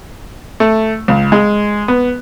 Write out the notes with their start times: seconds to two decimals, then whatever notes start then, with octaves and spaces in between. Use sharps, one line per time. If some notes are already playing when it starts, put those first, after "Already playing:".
0.60 A3
1.08 C#2
1.32 G#3
1.88 B3